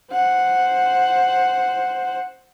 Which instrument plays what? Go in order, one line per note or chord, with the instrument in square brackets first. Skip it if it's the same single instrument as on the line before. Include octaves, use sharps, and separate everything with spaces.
[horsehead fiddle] C5 F#5